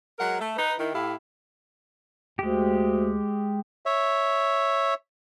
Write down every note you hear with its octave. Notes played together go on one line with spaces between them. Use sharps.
F#3 G#3 A#4 F#5
A3
D#4 B4
D#3 E4
A2 E4 G4 F5
D2 G#3 G4
C#5 E5